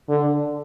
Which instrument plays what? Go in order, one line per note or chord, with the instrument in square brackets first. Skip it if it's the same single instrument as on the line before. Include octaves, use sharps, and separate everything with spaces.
[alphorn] D3